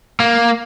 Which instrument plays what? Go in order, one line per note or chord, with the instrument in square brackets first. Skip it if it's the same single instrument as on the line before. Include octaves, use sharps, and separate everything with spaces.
[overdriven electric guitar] A#3